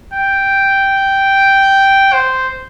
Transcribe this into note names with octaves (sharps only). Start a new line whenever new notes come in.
G5
C5